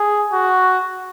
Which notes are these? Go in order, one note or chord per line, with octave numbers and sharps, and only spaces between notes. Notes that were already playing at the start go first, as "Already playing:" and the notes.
Already playing: G#4
F#4